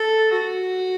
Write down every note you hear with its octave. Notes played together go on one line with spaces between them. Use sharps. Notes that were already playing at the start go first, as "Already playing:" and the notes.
Already playing: A4
F#4